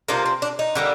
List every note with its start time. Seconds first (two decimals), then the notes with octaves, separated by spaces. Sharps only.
0.08 C3 F3 A#3 D4
0.26 C4
0.42 D4
0.59 D#4
0.75 D3 G3 A#3